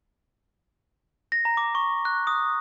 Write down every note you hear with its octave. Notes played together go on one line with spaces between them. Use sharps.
A#6
A#5
D6
C#6
F#6
D#6